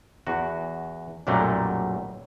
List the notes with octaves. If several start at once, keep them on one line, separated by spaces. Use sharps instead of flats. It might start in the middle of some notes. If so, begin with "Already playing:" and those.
E2 F#4
B1 F#2 A#2 F#3 G3 A3